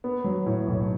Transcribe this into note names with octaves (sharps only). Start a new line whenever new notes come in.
B3
F#3
A2
B1